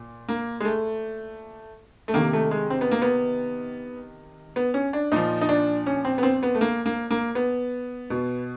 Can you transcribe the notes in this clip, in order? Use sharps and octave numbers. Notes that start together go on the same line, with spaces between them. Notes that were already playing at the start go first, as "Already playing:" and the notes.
Already playing: A#2
A#3
G#3
A3
A3
C3 D#3 A#3
A3
G#3
C4
B3
A#3
B3
B3
C#4
D4
A#2 F3 D#4
D#4
D4
C#4
C4
B3
C4
B3
A3
A#3
A#3
A#3
B3
B2